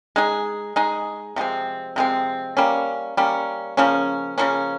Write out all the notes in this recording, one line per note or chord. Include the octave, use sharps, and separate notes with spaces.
G#3 D#4 G#4
G#3 D#4 G#4
C3 F3 G#3 C4
C3 F3 G#3 C4
G3 A#3 C#4
G3 A#3 C#4
C#3 F3 A#3 C#4
C#3 F3 A#3 C#4